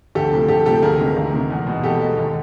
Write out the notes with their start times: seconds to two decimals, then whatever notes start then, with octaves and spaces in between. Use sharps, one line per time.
0.15 D2 G4 A4
0.32 C3 F3 A3
0.48 D2 G4 A4
0.66 C3 F3 A3 G4 A4
0.82 D2 G#4 A#4
0.99 C3 D#3 G#3
1.17 D2
1.33 C3 D#3 G#3
1.51 E2
1.67 B2 G#3
1.84 E2 G4 A4
2.01 B2 G#3
2.17 D#2